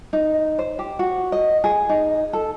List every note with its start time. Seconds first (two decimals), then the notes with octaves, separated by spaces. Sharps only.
0.13 D#4
0.59 C5
0.79 G4
0.99 F#4
1.32 D#5
1.64 G#4
1.89 D#4
2.33 A4